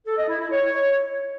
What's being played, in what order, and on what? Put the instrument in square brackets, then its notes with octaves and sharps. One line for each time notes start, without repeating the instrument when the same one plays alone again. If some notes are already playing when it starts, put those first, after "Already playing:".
[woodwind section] A4
D#5
E4
E4
C#5